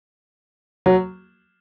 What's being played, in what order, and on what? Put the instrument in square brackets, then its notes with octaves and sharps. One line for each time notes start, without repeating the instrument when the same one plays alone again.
[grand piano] F#3